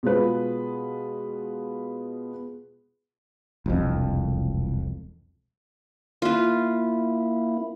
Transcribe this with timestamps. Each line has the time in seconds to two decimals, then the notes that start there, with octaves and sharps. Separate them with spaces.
0.03 B2 G#3 F4 G#4 B4
3.66 E1 C2 F2
6.22 A#3 E4 F4 B4